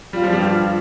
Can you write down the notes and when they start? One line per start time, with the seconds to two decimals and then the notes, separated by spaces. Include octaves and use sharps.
0.13 G3 F4
0.23 F3
0.33 G2 G3
0.41 G4
0.45 F4